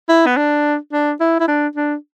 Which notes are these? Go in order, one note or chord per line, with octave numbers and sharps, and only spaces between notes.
E4
B3
D4
D4
E4
E4
D4
D4